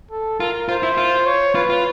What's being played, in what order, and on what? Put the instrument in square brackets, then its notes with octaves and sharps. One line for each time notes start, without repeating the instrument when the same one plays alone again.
[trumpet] A4
[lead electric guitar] F4 [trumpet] A#4
[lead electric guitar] F4 [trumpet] C5
[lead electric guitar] E4
F4
[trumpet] C#5
[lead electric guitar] F4 [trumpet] B4
[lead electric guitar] F4